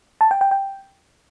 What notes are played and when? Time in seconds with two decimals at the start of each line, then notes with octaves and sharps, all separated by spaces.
0.21 A5
0.31 G5
0.41 G5
0.51 G5